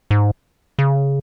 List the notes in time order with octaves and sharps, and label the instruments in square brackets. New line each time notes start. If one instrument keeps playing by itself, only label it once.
[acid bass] G#2
C#3